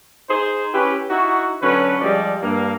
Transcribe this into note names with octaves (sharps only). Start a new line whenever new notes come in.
D#4 G#4 C5
C#4 E4 G4 B4
D#4 E4 F#4
D3 F#3 C#4 B4
F3 G3 G#3 D5
G2 A#3